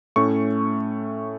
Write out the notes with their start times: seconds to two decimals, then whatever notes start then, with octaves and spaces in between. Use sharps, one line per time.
0.16 A2 A3 C#4 C#6